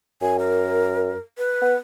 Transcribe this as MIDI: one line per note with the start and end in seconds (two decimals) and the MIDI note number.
0.22 1.14 42
0.22 0.37 80
0.39 1.19 70
1.38 1.77 71
1.62 1.76 59